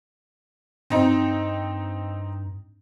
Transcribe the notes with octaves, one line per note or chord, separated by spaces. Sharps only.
G2 C4 D#4